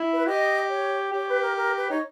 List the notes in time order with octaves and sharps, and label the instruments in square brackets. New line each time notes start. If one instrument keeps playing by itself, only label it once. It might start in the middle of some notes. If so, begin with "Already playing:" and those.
Already playing: [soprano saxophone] E4
[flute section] B4
[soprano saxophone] G4 [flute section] D#5
[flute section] C#5
[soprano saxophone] G4 [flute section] C#5
[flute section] B4
A#4
A#4
B4
[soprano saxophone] D#4 [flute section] C#5